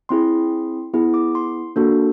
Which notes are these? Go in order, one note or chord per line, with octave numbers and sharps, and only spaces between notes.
C4 E4 G#4 C6
B3 E4 G#4
D6
C6
A#3 D4 F#4 A4